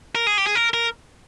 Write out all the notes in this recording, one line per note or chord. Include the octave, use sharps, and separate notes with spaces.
A#4
G#4
G4
G#4
A#4
A#4